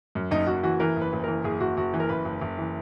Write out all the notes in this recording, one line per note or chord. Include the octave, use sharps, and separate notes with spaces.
F#2
F#1 D#4
F#1 F#4
E3 F#4
E3 A#4
F#1
B4
F#1
E3 A#4
F#1 G#4
F#1 F#4
F#1 F#4
E3
A#4
F#1 B4
F#1
F#1
E3